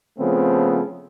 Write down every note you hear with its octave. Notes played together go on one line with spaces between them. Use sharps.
C#3 F3 A3 B3 C4